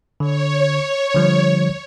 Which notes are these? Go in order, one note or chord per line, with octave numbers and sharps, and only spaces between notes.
D3 C#5
D3 F3 G3